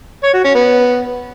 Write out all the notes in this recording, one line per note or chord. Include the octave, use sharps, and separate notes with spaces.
C#5
F#4
C#4
B3